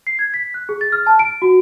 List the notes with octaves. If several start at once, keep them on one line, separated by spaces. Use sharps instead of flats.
C7
G#6
B6
F#6
G#4
A6
F6
A5
D7
F#4